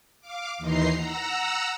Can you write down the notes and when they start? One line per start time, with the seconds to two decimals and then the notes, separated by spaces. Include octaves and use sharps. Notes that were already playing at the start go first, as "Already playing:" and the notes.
0.21 F5 D6
0.58 D#2 E3 D#4 A#5 C6 C7
0.96 F#5 A#5 E6